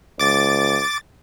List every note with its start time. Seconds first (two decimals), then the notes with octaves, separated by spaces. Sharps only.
0.20 C#2 D6 A6